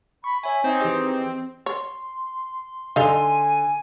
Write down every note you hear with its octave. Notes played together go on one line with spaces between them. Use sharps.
B5 C#6
C#5 E5 G#5
C4 D#4
E3 G4 G#4 D#5
C#5 C6
D3 D#4 A4 F5 G#5 G7